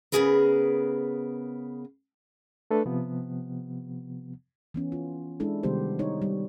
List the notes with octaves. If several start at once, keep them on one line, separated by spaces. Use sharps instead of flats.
C#3 G#3 B3 G#4 A#4 B4
A3 D4 A4 B4
C3 F3 B3
E3 B3 C#4
F4
G#3 D4 E4 A4
C3 D#3 G3 B3 G4 C5
D#4 C#5
G3